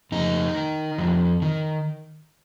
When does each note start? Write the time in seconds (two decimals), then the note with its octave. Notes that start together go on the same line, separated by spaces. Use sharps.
0.12 F2 D#4
0.55 D#3
0.98 F2
1.42 D#3